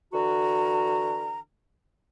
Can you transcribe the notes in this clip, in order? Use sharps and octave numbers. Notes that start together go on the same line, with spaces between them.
D3 E3 F#4 A#5